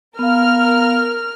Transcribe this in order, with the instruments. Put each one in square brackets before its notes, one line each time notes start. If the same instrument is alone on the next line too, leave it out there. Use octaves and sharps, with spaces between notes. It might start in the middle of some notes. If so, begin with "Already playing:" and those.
[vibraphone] B3 F5 [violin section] A#4 F6